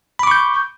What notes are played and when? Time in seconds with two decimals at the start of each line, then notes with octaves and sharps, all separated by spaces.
0.19 B5
0.23 D6
0.27 C#6
0.31 G6